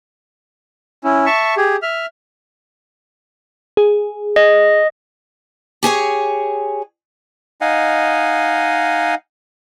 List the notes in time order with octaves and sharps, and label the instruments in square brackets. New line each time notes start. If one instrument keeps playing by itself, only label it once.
[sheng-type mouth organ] C#4 E4
E5 A5 C#6
G4 G#4
E5 F6
[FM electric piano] G#4
[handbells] D#5
[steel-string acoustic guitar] G4 G#4 C#5 G#5
[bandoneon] D#4 D#5 F5 F#5 G#5